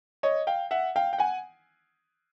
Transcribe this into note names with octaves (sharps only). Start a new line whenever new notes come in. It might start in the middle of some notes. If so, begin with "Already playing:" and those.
C#5 D#5
F5 G5
E5 F#5
F5 G5
G5
F#5 G#5